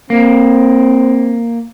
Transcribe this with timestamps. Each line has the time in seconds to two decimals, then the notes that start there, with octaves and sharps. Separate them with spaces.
0.10 A#3 C4